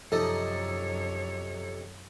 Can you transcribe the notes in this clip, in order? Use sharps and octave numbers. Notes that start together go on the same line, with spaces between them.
F#2 C3 F3 D#4 A4 C#5